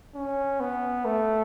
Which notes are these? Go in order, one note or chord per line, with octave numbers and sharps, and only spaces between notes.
C#4
B3
A3